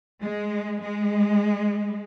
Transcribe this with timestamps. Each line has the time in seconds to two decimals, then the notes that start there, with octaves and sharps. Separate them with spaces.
0.23 G#3
0.82 G#3